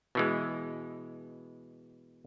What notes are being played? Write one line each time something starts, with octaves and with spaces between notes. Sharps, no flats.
B2 E3 G#3